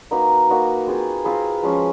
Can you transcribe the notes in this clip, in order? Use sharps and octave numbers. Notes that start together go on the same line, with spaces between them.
A#3 D#4 F#4 B4
A#3 D#4 F#4 B4
C4 F4 G#4 B4
C4 F4 G#4 B4
F3 G#3 C#4